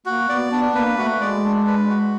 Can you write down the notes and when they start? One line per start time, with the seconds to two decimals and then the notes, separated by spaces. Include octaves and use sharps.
0.06 A#3 F#4
0.29 B3 D5
0.52 B3 D4
0.75 A#3 B4
0.98 A3 F#4
1.21 G#3 D5
1.44 D4
1.67 B4
1.90 F#4